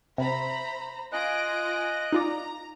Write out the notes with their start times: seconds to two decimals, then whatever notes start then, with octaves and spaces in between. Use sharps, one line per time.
0.18 C3 C5 E5 A#5 B5
1.12 F4 D#5 G#5 F#6 A#6 D7
2.12 D#4 F4 D5 A#5